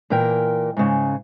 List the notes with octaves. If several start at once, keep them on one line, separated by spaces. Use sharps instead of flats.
A#2 E3 A#4 G5
G#2 C#3